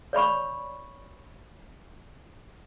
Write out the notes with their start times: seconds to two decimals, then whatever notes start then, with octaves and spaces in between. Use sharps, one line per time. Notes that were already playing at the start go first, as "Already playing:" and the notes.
0.13 C#5 D5 B5 C#6